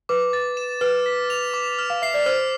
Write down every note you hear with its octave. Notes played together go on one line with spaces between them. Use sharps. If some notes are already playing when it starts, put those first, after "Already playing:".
B4 D6
A6
E7
B4 F6
B6
F7
D6
F6
F5
E5 C7
D5
C5 F6